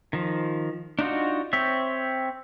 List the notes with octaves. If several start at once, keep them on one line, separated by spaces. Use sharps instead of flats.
D#3 F3
D4 D#4 F4 F#4
C4 C#5 E5